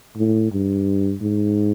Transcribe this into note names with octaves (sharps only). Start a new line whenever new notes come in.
A2
G2
G#2